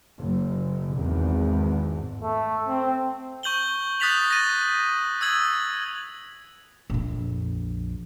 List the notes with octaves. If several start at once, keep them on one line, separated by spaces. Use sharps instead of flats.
F#1
G#1 E2
A3
C4
C#6 G6 F#7 G7
D#6 F#6 A6 B6 F7 F#7
A6 A#6 D#7
D#6 E6 G#6 F#7
A#1 F2